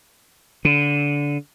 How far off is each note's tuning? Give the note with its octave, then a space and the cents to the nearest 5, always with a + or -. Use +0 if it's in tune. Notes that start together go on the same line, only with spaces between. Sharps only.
D3 -20